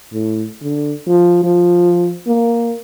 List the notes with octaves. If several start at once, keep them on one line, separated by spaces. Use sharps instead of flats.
A2
D3
F3
F3
A#3